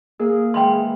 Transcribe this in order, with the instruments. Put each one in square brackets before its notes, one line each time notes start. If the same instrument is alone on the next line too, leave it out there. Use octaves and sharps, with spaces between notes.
[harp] A#3 [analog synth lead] G#4 [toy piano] A#4
[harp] E3 G#3 [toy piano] G5 B5 C6